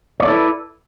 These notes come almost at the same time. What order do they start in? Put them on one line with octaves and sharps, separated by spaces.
C#5 D5 A4 E4 B4